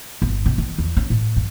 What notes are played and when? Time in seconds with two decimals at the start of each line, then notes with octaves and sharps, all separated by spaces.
0.22 G1
0.46 C3
0.58 D#3
0.78 E2
0.97 C#4
1.10 A2
1.36 G2